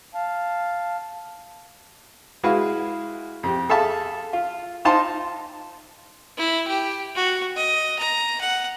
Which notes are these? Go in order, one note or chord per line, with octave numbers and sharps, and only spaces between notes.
F5 A5
G#3 E4 F#4 G#4 B4 F5
F2 G4
G#4 A4 E5 F5 A5
F4
D#4 F4 C5 A5 C6
E4
G4
F#4
D#5
A#5
F#5